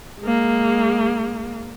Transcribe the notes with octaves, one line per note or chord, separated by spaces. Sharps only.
G#3 A#3